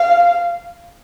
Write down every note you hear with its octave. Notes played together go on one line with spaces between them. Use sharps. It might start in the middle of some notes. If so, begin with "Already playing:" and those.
Already playing: F5